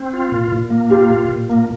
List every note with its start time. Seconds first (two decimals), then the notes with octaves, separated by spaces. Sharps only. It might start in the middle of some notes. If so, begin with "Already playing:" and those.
Already playing: C4
0.13 F4
0.32 A#2
0.52 A#2
0.70 A#3
0.90 F4 G4
1.10 A#2
1.29 A#2
1.50 A#3